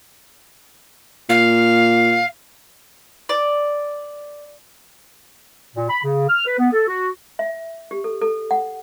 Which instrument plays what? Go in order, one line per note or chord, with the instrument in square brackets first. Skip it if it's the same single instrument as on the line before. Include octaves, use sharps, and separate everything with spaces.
[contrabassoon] A#2 [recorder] F5
[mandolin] D5
[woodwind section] A#2
B5
C#3
F6
B4
B3
A4
F#4
[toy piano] E5
G4
A4
A4
F#5